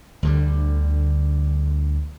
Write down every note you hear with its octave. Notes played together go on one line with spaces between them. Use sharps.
D2 D3 G3